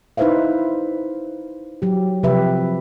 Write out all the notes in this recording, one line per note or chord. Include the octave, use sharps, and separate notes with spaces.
D#4 E4 B4 C5 E5 F5
F#3 G4
C3 F3 G4 B4 E5